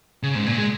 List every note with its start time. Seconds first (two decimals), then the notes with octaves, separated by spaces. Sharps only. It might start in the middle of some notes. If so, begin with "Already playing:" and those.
0.23 C#3
0.35 G#2
0.46 A#2
0.58 G#3